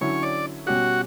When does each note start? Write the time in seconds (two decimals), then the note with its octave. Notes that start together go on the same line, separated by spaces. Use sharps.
0.01 D3 F#3 C#4 E4 C#5
0.23 D5
0.66 B2 G3 C#4 F#4 G4